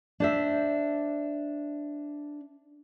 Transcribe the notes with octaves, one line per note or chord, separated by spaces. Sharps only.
D4 C5 E5